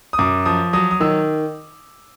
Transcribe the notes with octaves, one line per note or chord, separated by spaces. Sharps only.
D#6
F#2 D6
F3 D#6
F#3 D#6
D#6
D#3 E6